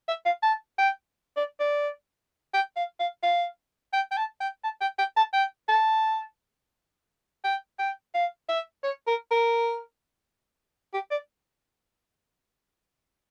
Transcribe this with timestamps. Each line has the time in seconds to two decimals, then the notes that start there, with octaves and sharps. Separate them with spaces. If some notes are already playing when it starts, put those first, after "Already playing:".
0.08 E5
0.25 F5
0.42 A5
0.78 G5
1.36 D5
1.60 D5
2.54 G5
2.76 F5
2.99 F5
3.23 F5
3.93 G5
4.11 G5
4.17 A5
4.40 G5
4.64 A5
4.81 G5
4.99 G5
5.16 A5
5.33 G5
5.69 A5
7.44 G5
7.79 G5
8.14 F5
8.49 E5
8.84 C#5
9.07 A#4
9.31 A#4
10.93 G4
11.11 D5